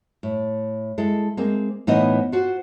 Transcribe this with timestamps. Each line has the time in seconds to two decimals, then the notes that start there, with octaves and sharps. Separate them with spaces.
0.23 A2
0.98 G#3 E4 A4
1.37 G#3 A#3 C4
1.87 A2 E3 B3 D#4 C5 D#5
2.32 F4 F#4 C5